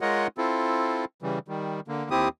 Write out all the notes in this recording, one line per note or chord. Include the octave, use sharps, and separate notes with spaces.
G#3 F4 A#4 C#5 D#5 F#5
C4 E4 F4 A4
C#3 E3 G3
D#3 G3
D3 A#3
D#2 C4 E4 G4 D#6